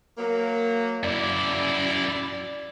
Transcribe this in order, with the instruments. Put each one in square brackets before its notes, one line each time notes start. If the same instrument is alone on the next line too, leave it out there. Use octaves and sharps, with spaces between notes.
[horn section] F#3 A#3
[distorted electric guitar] F#2 E4 [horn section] D5